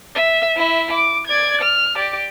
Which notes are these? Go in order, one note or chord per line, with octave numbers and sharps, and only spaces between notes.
E5
E4 E5
D6
D5 G#6
F6
G4 D5